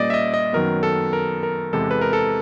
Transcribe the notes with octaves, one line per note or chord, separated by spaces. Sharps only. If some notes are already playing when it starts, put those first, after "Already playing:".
Already playing: A#2 G3 A#3 C#4 D5 D#5
E5
D#5
D#5
F#2 D#3 F#3 B3 A#4
A4
A#4
A#4
E2 C3 E3 G#3 A4
B4
A#4
A4